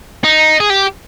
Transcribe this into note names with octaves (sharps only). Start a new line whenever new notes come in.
D#4
G#4
G4